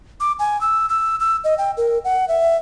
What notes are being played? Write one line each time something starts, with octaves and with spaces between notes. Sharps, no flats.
D6
G#5
E6
E6
E6
D#5
G5
A#4
F#5
E5